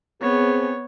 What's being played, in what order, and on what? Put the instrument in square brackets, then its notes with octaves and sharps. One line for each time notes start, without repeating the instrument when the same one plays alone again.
[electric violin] B3 C#5 [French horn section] C4 G#4